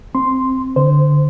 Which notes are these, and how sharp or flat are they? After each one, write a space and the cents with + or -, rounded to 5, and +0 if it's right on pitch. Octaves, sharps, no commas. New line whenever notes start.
C4 +0 C6 +0
D3 +0 C5 -10